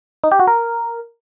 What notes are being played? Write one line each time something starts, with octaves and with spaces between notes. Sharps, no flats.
D#4
G4
F#4
A#4